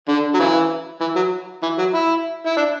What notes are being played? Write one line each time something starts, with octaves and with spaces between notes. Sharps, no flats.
D3
F#3
C#3 E3
E3
F#3
E3
F#3
E4
E4
D4